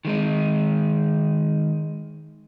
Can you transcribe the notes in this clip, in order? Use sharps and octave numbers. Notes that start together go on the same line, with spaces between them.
D#3 G#3 D#4